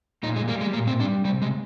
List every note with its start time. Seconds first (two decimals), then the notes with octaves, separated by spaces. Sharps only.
0.23 A#2 D#4
0.36 G#3
0.48 G3 A#3
0.61 G#3
0.73 A#2 A#3
0.87 C4
1.00 G3 D4
1.25 C3 G3
1.42 G#3